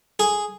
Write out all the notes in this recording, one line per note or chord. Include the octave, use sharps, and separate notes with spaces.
G#4